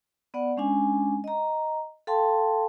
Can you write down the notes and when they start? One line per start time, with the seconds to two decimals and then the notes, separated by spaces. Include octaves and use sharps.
0.34 B3 D5 F#5
0.57 G#3 C#4 D4 G#5
1.24 D#5 A#5
2.07 A4 F5 G5 A5 C6